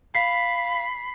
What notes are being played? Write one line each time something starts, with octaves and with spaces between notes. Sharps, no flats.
F5 B5 B6 C7